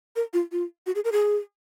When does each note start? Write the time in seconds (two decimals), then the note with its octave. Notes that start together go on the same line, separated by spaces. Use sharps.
0.16 A#4
0.33 F4
0.52 F4
0.86 F#4
0.95 G#4
1.04 A#4
1.12 G#4